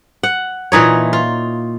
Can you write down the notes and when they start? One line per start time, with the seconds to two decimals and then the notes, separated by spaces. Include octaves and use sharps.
0.23 F#5
0.72 A#2 E3 D#4 C#5
1.13 F4